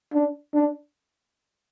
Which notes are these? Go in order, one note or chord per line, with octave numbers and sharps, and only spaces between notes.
D4
D4